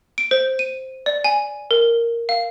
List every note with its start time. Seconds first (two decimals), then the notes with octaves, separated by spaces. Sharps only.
0.18 D7
0.31 C5
0.59 D#7
1.06 D5
1.24 G#5
1.71 A#4
2.29 F5